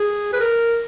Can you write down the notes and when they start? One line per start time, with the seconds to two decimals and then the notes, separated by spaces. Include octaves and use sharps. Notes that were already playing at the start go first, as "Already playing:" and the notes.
Already playing: G#4
0.33 B4
0.40 A#4